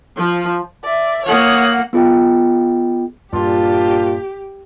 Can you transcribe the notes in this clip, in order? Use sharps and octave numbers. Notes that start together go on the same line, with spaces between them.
F3
D5 E5
A#3 C#5 F#5 D#6
B3 F4 G#4 D#5 G5
G2 A#2 D4 F4 G4